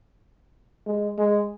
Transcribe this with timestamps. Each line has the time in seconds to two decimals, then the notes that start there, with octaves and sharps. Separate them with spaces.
0.87 G#3
1.18 G#3